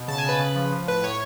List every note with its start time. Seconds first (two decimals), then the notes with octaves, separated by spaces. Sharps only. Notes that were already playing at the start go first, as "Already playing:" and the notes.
Already playing: B2
0.08 C#3 A5
0.18 G#5
0.24 C#3 B4
0.40 C#3
0.56 F3
0.72 F3
0.87 A2 B4
1.03 A2 C#5